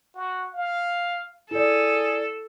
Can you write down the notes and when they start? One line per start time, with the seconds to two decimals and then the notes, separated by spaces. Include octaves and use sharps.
0.14 F#4
0.54 F5
1.51 E4 G#4 A4 D5